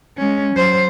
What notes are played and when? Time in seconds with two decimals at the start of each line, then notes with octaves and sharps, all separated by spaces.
0.17 G#3 C#4
0.55 F#3 C5